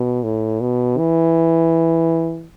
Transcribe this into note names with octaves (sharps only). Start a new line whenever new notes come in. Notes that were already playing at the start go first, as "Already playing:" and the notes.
Already playing: B2
A2
B2
E3